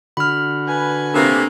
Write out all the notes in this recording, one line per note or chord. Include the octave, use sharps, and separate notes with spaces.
D3 F#4 B5 F6
B4 G#5
C3 A3 A#3 D4